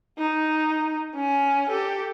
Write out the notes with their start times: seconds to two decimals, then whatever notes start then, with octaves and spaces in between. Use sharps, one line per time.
0.18 D#4
1.15 C#4 G#5
1.69 G4 A4